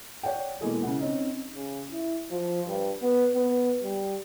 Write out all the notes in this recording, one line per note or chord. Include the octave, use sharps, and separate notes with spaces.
C#5 D5 F#5 G5
B2 E3 G#3 A#3 G#4 A4
C#3 E4 F#5
C4 C#4 D#4
C#3
E4
F3
G2
B3
B3
G3